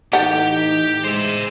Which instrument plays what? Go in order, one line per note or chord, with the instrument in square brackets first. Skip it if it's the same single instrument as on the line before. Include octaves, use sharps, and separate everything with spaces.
[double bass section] A2 E3 [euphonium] D#4 [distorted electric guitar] G4 G5 [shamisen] A4 F#5
[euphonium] G#3 [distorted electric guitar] C5 E5